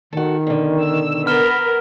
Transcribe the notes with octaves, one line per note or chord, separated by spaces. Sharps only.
D#3 F#4 A4
B2 D3
E6
B3 A#4 F6 E7 G7